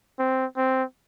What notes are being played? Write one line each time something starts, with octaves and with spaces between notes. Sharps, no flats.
C4
C4